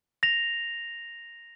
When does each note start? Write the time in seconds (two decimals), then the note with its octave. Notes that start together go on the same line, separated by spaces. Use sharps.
0.23 A#6 F7